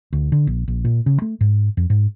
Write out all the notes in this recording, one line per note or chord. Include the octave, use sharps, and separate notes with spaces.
D2
D3
A#1
A#1
A#2
C#3
A3
G#2
F2
G#2